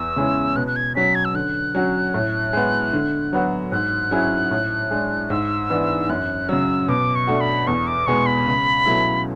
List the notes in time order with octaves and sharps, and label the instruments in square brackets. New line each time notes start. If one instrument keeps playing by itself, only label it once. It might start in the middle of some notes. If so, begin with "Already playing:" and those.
Already playing: [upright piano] E2 [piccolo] E6
[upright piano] C#3 G#3 C#4 E4
[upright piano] B2 [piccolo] F#6
[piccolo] F#6
G#6
[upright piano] F#3 C#4 [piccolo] B6
[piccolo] G#6
E6
[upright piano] D3 [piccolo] F#6
[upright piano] F#3 C#4 F#4
A2
G#3 B3
D3
F#3 B3 F#4
[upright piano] G#2 [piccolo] F#6
[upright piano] F#3 C#4 E4 G#4
A2
G#3 D4
[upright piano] G#2 [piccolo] E6
[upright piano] E3 B3 D4
[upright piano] F#2 [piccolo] F#6
[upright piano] C#3 F#3 [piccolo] E6
[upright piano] B2 [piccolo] D6
[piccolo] C#6
[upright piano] A3 D4 F#4
[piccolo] B5
[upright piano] E2 [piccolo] C#6
[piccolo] D6
[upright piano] B2 G#3 B3 [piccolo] C#6
[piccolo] B5
[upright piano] C#2
B2 F#3 A3 E4